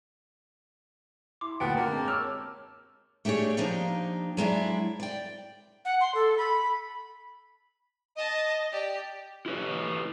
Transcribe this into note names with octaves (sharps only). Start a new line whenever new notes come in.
E4 C6 D6
D2 A#2 B3 G5 A5
F#2 D3 A#3
G#3 C4 A5
C#5 D6 E6 F6
A3 D4 G4 G#4 C#5
F3 A#3 D4 D#4 G4
F#3 G#3 D4 E4
D5 G5
F#5
C6
A4
B5
D#5 A5 D#6
G4 D5
E4 G4 B4 C#5